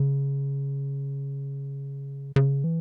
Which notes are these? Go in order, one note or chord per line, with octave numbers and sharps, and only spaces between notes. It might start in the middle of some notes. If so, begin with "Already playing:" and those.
Already playing: C#3
C#3
E3